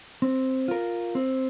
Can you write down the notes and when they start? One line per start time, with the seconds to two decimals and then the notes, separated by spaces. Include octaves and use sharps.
0.22 C4
0.68 F4 A#4
1.15 C4